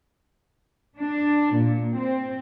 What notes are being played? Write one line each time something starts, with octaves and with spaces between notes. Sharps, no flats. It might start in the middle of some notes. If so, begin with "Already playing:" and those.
D4
A#2
C4